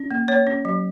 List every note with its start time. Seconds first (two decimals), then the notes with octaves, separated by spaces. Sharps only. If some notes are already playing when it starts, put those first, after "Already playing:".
Already playing: C#4
0.11 A#3
0.28 A#3 C#5
0.47 C#4
0.65 F#3